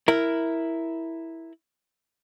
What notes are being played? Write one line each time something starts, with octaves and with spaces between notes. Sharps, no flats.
E4 A#4